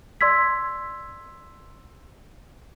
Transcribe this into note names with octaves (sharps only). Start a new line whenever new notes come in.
D5 C6 E6 G#6 B6